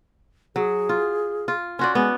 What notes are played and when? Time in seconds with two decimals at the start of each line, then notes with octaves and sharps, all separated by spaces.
0.56 F#3 G#4
0.89 F4
1.48 F4
1.79 C#4 F#4 D5 C6
1.95 G#3 B3